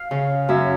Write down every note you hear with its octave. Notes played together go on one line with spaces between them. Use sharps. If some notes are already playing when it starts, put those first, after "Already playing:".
Already playing: F5
C#3
F#2 E5